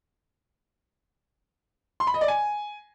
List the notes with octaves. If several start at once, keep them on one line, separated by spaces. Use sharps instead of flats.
C6
B5
D#5
D5
G#5